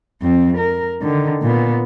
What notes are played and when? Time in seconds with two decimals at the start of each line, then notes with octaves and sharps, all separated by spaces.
0.22 F2 C4
0.57 A#4
1.02 D3 D#3
1.42 A#2 B3